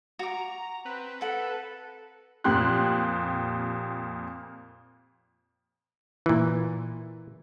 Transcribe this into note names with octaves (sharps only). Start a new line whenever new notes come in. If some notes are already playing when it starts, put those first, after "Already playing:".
F#4 A#5 D6
C4 B4
A4 A#4 F#5
F2 A#2 G4 C6 F#6
A#2 E3